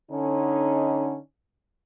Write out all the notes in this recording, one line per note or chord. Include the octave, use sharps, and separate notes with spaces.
D3 C#4 D#4